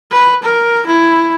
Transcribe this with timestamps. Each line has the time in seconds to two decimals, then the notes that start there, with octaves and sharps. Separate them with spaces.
0.11 B4
0.43 A#4
0.86 E4